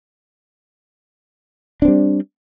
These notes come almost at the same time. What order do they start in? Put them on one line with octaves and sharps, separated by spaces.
D4 C4 G3